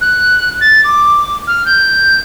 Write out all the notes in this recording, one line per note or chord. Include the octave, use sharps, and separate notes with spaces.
F#6
A6
D6
F6
G6